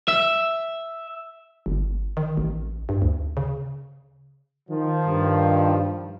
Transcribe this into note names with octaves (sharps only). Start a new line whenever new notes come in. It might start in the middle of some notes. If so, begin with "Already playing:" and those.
E5
G1
D#3
A1
G2
D2
C#3
D#3 F3
G2